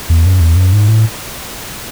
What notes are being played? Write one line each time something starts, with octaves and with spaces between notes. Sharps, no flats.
E2
F#2
E2
F#2
G#2
A2